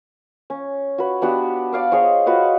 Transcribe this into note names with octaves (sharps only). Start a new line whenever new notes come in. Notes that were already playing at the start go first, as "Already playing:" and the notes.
C#4
F#4 B4
B3 D4 F#4 G4
D5 F5 D6
G#4 C5 C#5 D#5
F4 F#4 B4 D#5